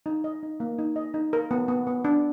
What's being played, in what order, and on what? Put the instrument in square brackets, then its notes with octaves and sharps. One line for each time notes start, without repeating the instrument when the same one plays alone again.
[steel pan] D#4
D#5
D#4
A#3
D#4
D#5
D#4
A#4
B3
B3
B3
D4